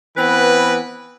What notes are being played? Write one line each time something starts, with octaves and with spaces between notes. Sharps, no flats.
E3 B3 C4 B4